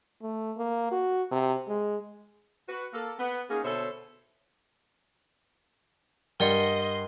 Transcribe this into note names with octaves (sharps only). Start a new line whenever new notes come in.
A3
A#3
F#4
C3
G#3
F#4 B4
A#3 A4
B3
A#3 C#4 D#4 G#4
B2 D3 A4 C5 C#5 E5
G2 A#4 D5 D#5 F#5 C6